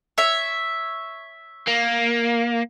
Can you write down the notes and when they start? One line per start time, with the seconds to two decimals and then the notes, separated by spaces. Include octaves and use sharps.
0.18 C#5 E5
1.68 A#3